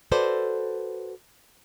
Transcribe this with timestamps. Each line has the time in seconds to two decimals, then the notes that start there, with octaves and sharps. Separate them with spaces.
0.11 F#4 A4 B4 C5 D5